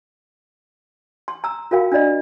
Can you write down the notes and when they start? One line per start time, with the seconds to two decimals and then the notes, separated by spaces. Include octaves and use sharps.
1.28 C6
1.44 A#5 E6
1.71 F4 F#4 A#4 F5 G5
1.92 D4 F4 D5 D#5